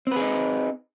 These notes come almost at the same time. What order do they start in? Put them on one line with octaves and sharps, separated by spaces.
C4 B4 G#4 D#4